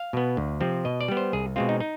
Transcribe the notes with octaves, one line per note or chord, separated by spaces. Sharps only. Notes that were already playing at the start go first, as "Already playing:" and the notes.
Already playing: F5
B2 B3
D2
C3 F3 C4
B2 D#5
D5
G3 B3
C5
C2 G#4
B2 G#3 C4 F4
D#4
D#4